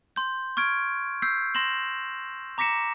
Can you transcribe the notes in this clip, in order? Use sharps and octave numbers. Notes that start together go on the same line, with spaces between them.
C6 G6
C#6 F6 G#6 D7
E6 G6 B6 C7
C6 A#6 E7 F#7
A#5 D6 A#6 B6 C#7 E7